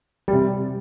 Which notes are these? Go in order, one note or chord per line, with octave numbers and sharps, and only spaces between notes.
G3
C3